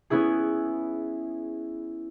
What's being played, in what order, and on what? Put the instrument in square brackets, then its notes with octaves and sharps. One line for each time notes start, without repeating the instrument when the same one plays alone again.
[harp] B3 C#4 E4 G#4